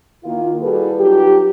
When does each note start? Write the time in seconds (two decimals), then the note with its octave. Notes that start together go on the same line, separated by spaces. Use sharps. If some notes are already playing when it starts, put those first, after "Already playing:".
0.24 D#3 A#3 E4 F4
0.63 G3 E4 F#4 G#4 A4 B4
1.00 F#3 D#4 F4 G4